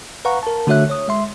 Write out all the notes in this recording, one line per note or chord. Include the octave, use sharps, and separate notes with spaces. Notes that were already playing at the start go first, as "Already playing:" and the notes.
B4 F5 F#5 A#5 C#6
A#4 A5
D3 A3 F#4 C#5 E5 F#6
C#5 D#6
G#3 E5 C6